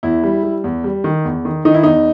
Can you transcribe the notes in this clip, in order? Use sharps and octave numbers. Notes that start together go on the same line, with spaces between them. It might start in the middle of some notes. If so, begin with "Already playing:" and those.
E2 E4
G3
G3
E2
G3
D#3
E2
D#3
D#3 D#4
E4
E2 D#4